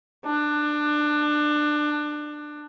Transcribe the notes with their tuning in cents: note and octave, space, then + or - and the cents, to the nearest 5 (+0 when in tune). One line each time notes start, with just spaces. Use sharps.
D4 +20